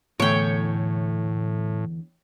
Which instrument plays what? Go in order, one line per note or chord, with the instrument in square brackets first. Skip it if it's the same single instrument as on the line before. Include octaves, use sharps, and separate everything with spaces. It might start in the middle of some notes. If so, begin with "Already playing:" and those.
[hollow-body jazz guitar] E2 D3 A3 [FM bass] A2 [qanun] C#5 G5